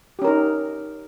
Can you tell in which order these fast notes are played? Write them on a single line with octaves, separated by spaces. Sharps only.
G4 C#4 A#4 D#4